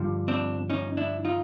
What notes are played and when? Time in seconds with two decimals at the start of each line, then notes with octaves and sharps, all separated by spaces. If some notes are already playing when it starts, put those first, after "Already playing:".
Already playing: G2 D3 F3
0.28 C4 D4
0.70 C#4 D#4
0.97 D4 E4
1.25 D#4 F4